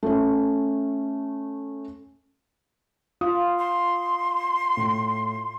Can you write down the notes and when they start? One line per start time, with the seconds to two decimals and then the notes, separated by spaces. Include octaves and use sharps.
0.03 A3 C#4
3.21 F4 D#6
3.59 C6
4.77 A2